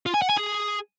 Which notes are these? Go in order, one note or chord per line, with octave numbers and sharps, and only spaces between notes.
F4
G#5
F#5
G#5
G#4